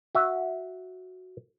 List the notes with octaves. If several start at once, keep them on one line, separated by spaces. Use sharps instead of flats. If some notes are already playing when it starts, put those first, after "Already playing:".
F#4 E5